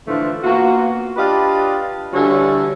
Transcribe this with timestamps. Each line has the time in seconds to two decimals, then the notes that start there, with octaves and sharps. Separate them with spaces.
0.07 A2 D3 E3 F3 A3 F4
0.42 A#3 B3 F4 F#4
1.16 D4 F4 G4 B4 D5 D#5
2.12 D3 E3 G3 C#4 F#4 C#5